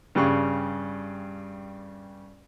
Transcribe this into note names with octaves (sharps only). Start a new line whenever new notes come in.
G2 C#3 G3 C#6 F#6